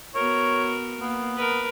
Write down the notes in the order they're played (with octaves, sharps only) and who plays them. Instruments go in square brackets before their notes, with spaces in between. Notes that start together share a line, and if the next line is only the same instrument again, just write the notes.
[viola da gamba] B3 F#4 A#4 [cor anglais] C#5
[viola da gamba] A#3 [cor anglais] B3
[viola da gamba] A#4 B4